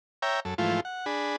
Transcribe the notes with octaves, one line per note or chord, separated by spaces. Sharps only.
C#5 E5 G5 A#5
F#2 A4
G#2 E3 F3 A3 F4
F#5
D4 G#4 B5